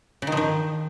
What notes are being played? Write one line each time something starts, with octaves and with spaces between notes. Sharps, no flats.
C#3
D#3
F3
D#3